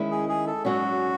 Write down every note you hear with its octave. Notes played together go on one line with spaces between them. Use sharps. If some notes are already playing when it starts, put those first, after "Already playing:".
Already playing: D#3 G#3 C#4 E4
G#4
G#4
A4
G#2 F#3 C#4 F#4